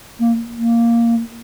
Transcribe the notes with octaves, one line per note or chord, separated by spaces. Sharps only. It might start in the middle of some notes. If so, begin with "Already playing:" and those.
A#3
A#3